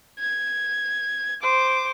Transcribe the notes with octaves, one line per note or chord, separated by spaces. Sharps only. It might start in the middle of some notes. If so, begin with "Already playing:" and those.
G#6
C5 D6